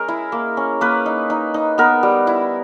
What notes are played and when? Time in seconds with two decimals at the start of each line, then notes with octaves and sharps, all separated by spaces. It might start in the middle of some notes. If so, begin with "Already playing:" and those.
Already playing: G#3 C#4 G#4 A#4
0.08 E4
0.32 A#3
0.57 C#4
0.81 A#3 B4
1.06 D#4
1.30 D#4
1.54 D#4
1.78 B3 A#4
2.03 G3
2.27 E4